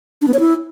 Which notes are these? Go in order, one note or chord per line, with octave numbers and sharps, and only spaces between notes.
D4
B3
C#5
E4